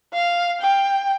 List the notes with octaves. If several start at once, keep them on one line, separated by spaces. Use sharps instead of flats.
F5
G5